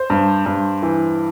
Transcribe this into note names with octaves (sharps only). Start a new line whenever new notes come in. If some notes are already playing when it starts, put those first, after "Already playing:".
Already playing: C5
G2
G2
E3